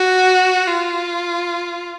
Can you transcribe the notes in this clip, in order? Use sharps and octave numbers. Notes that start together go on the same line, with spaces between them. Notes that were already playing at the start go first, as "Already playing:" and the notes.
Already playing: F#4
F4